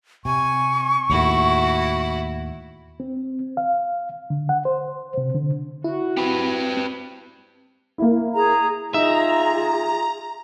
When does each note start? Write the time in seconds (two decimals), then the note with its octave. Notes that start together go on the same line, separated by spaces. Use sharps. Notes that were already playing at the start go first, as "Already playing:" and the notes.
0.25 C3 G#5 C#6
1.10 D#2 A2 E4 F#4
3.00 C4
3.57 F5
4.30 D3
4.49 F#5
4.65 C5
5.18 C3
5.35 D3
5.84 E4 F#4
6.17 C4 G4 B4
7.98 A#3 E4
8.34 G#4 A#5
8.94 D#4 F4 G#4 E5 A#5